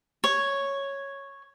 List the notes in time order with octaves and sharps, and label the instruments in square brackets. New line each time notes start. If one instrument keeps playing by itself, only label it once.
[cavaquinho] C#5